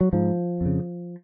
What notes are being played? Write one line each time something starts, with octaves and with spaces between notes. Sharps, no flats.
F#3
G#2 F3
F2 C#3